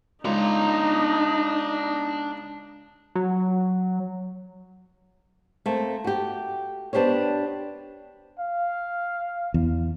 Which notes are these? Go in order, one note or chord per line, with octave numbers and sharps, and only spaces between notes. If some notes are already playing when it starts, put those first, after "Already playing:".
C#2 D4 D#4 A#5
F#3
A3 A#3 C4
F#4 G4
B3 D4 G4 C5 C#5
F5
E2